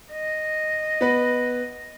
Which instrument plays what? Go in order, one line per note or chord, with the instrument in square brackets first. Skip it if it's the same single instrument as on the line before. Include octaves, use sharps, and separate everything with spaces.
[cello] D#5
[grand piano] B3 B4